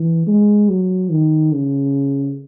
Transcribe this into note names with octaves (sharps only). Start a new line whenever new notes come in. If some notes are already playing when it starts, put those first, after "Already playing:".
Already playing: E3
G#3
F#3
D#3
C#3